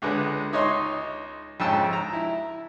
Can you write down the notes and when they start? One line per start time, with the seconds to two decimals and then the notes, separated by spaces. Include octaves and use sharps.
0.02 C#2 D3 G#3 B4
0.53 C#2 D#4 C#5 D#5 C6
1.60 F2 G#2 C#3 G5 A5 E6
1.93 A#5
2.13 E4